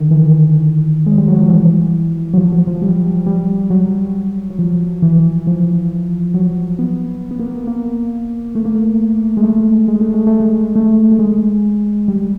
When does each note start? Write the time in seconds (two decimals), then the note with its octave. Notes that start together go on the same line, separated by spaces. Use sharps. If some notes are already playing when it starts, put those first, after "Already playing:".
Already playing: D3 D#3
0.11 E3
0.18 D#3
1.06 G#3
1.18 G3
1.28 F#3
1.39 F3
1.50 E3
2.34 F#3
2.38 F3
2.52 F#3
2.67 F3
2.82 G3
3.27 G3
3.70 F#3
4.50 F#3
4.59 F3
5.02 E3
5.47 F3
6.34 F#3
6.79 B3
7.31 B3
7.39 A#3
7.48 B3
7.67 A#3
8.55 A3
8.65 A#3
8.75 A3
9.37 G#3
9.43 A3
9.88 G#3
10.01 A3
10.14 G#3
10.27 A3
10.40 G#3
10.75 A3
11.12 A3
11.19 G#3
12.08 G3